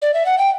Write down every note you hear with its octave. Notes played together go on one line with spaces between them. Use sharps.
D5
E5
F#5
G5